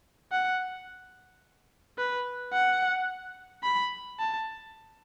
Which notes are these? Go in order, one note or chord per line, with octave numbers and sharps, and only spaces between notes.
F#5
B4
F#5
B5
A5